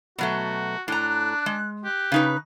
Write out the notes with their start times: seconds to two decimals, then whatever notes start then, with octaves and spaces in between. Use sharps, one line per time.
0.18 B2 F#3 A3 F#4
0.88 A2 D4 A#5 F#6
1.46 G#3
1.84 G4 F#6
2.12 C#3 D#4 B4